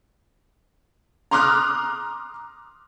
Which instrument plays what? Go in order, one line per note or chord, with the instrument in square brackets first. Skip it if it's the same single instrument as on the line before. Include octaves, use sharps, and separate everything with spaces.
[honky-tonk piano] A#5 C6 D6 D#6 F6 F#6